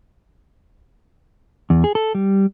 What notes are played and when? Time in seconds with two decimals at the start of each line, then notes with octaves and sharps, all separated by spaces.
1.70 E2
1.84 G#4
1.95 A4
2.15 G3